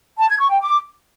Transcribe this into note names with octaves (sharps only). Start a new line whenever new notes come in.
A5
G#6
C#6
G5
D6